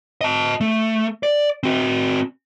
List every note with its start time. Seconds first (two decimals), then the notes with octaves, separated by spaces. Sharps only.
0.21 D#5 A5
0.61 A3
1.23 D5
1.63 C4 F#4